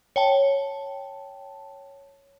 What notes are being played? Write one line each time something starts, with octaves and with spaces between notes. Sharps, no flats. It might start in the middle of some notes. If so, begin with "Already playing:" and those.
C#5 G5 A5